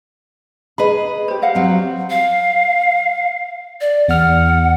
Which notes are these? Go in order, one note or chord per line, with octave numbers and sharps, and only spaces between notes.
G#4 B4 D#5 B5
G4 C5
D#5 F5 F#5
F#3 G3 C4
F5
D5
E2 F#5 F6